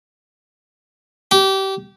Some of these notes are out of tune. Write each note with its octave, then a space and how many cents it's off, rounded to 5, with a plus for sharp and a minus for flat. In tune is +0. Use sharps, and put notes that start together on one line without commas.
G4 -25